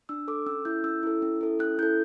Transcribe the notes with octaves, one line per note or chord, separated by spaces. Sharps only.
D4 E6
A4 D6
C#4 E6
E4 A4 G6
C#4 E6
E4 A4
C#4
E4 A4
C#4 F#6
E4 A4 G6